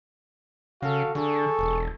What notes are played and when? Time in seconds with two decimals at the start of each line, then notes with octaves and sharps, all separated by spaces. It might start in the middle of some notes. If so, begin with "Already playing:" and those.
0.82 C#3 F#4 A4 F5
1.15 D3 G#4 A4 C#6
1.59 E1